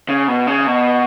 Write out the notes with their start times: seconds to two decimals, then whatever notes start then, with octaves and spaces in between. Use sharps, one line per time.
0.09 C#3
0.28 B2
0.47 C#3
0.67 B2